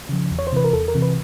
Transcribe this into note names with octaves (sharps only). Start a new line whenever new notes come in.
C#3 F3
E2
C#5
C5
C3 E3 B4
A#4
E2 A4
A#4
C3 E3
B4